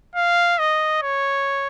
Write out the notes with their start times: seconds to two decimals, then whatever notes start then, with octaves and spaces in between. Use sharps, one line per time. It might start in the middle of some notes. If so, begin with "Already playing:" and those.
0.16 F5
0.59 D#5
1.03 C#5